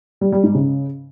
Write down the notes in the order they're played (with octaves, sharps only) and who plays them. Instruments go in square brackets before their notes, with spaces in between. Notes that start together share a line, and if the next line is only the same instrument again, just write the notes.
[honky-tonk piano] G3
G3
G#2
C#3